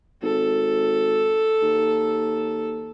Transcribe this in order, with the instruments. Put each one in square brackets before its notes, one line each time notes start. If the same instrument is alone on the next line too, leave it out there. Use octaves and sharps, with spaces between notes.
[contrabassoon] G#1 [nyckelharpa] A4
[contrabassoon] D#2